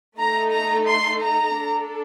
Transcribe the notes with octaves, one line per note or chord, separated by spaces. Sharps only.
A3 D#4 A4 A#5
A#5
C6
A#5
D4 A4